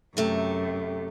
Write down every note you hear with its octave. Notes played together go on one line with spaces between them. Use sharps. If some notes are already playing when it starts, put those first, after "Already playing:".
F#2 C3 A3 G4